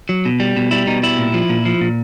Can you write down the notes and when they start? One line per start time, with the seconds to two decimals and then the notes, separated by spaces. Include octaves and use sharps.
0.09 F#3
0.25 B2
0.40 G3
0.57 B2
0.71 G3 E4
0.87 B2 D#4
1.03 G3 E4
1.19 A#2
1.34 F3
1.50 A#2
1.65 F3
1.81 A#2